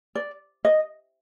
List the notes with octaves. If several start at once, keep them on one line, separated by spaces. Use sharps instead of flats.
D5
D#5